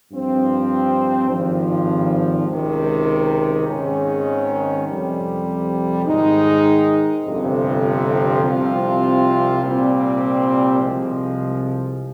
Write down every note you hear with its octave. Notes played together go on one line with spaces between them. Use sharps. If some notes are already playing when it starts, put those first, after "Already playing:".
G2 F3 C4
G#1 G2 F3
C#2 C3 D#3
G#1 G#2 D#3 G#3 C#4
F2 C3 G3
G#2 D#3 G#3 D#4
G1 F2 C3
C2 C3 F3 C4 F4
C2 A#2 G3 C4
C2 C3 F3 G#3